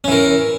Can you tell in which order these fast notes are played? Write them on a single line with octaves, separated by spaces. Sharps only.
C#4 E3 A#4